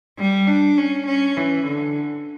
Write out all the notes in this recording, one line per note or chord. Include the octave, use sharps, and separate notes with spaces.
G3
D4
C#4
C#4
E3
D3